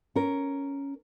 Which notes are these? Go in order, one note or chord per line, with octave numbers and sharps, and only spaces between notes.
C#4 A#4